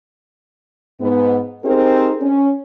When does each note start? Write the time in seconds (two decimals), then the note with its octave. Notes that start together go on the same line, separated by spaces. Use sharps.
1.01 G#2 B3
1.64 C4 D#4 G4 G#4 A#4 C5
2.21 C#4